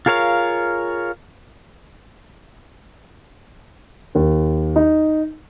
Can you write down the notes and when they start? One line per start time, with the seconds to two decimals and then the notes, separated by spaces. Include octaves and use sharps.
0.06 F4 G#4 A#4 C#5 F5
4.15 D#2
4.76 D#4